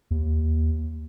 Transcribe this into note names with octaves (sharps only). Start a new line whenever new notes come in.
D#2